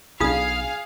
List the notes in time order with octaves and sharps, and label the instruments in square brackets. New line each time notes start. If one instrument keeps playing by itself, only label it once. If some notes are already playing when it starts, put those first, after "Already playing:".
[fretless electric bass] B1 G3 D4 [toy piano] F4 D#6 [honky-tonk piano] G#4 [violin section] F5